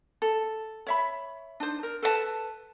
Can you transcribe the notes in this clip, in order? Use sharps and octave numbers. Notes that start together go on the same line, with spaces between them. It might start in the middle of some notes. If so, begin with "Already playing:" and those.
A4
C#5 E5 B5
D4 D#4 C5
A#4
A4 B4 C#5 A5